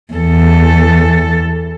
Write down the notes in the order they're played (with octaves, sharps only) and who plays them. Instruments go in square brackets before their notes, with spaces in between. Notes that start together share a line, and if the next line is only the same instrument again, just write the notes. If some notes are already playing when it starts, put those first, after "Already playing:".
[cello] E2 A4